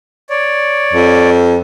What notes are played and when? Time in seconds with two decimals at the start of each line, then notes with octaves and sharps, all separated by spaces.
0.30 C#5 D5
0.93 F2